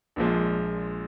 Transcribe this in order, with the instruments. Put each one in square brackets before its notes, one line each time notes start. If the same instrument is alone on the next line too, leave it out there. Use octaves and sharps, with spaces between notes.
[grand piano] A#1 A#2 F3 G#3